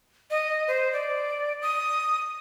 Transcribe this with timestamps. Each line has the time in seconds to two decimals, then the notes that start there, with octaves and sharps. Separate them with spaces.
0.31 D#5
0.68 C5
0.93 D5
1.62 D#6